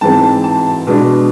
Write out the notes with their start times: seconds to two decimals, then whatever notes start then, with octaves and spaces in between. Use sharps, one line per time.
0.01 G#2 E3 G#3 C4 A5
0.44 A5
0.87 B2 G#3 D4